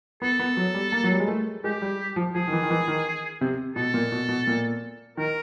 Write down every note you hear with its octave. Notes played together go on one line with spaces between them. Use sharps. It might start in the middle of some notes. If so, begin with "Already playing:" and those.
B3 A4
B3
F#3
G3
A#3
F#3
G3
G#3
A3
G#3 G4
G3
F3
F3 G#4
D#3
E3
D#3
E3
D#3
C3
B2 A4
A#2
B2
B2
A#2
D#3 A#4